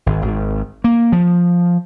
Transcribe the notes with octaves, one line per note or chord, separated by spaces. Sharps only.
G#1
G#1
A#3
F3